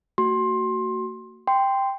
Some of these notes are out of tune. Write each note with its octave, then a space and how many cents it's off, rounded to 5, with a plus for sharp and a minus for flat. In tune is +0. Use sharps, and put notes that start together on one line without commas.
A#3 -45 F#4 +10 C6 +20
G5 +5 C6 -10